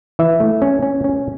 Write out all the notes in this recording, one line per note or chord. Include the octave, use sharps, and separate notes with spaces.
E3 E5
A3
C#4
C#4
C#4